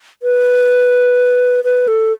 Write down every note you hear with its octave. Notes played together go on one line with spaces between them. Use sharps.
B4
B4
A4